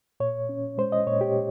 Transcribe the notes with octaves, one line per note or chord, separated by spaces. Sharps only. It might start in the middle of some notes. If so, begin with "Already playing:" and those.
A#2 C#5
C#4
G#3 C5
D#5
A#2 C#5
G4